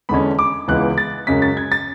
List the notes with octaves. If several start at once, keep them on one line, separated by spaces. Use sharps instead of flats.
E2 D3 G#3 C#4 B5
D6
C#2 C#3 E3 G#3 B3 F#6
A6
F#2 C#3 G#3 C#4 B6
A6
G#6
A6